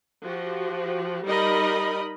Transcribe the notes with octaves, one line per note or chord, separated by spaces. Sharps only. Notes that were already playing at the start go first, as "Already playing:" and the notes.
F3 F#4 G4
G3 D#4 A#4 D#5 B5